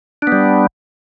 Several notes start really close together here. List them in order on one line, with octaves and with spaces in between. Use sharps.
D4 B3 G3